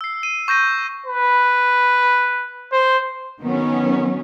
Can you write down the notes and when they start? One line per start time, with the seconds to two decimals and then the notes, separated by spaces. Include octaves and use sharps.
0.01 E6 C7
0.23 D#7
0.48 C#6 G6 A#6 D#7
1.06 B4
2.72 C5
3.41 D#3 F#3 B3 C#4